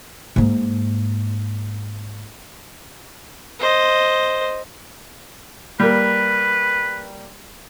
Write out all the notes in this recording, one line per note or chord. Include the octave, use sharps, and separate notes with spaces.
G#2 A#3
C5 D#5
G3 A#3 B4